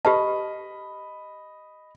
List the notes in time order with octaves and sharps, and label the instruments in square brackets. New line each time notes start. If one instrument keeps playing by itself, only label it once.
[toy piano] G4 B4 A5 [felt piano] D#5 B5